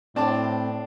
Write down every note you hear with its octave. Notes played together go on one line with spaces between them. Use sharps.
A2 C4 D4 A5 D6